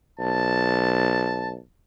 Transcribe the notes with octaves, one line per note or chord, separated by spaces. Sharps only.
B1 A5